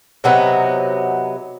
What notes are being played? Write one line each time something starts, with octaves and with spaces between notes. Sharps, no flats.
C3 F#3 B3 D#4